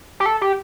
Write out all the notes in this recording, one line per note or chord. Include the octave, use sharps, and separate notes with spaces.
G4
A4
G4